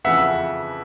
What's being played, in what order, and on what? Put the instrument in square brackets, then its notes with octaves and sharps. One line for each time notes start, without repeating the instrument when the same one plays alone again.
[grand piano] F2 C#3 E3 E5 F#5